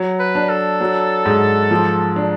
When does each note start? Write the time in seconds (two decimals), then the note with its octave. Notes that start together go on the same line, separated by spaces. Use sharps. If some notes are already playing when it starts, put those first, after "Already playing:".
Already playing: F#3
0.19 B4
0.35 D4
0.49 A4
0.81 F#3
1.26 G#2
1.71 F3
2.16 D4